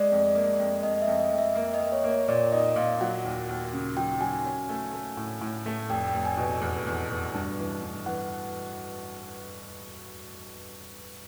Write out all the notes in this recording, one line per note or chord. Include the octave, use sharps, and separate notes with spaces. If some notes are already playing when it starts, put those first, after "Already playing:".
Already playing: G#3 D5
F2
A#3
F2
F2 D#5
E5
F2
D#5
F2
E5
A#3 E5
D#5
A#3
C#5
A#3
C#5
A#2 D5
D#4 D#5
A#2 F5
F#3 F#5
D#2
D#2
C#3
F#3 G5
F#3 G#5
C#4
A3
A3
A2
A2
A3
F1 G5
G5
F1
G#5
B2
E2
E2
B2
G2
E3
G2
E3 F#5